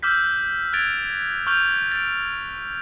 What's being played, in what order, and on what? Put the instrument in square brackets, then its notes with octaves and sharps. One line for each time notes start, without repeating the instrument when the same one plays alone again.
[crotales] D6 E6 F6 G6 B6
F#6 G#6 A6 D7 F7
C#6 F6 G6 F7
A6 D7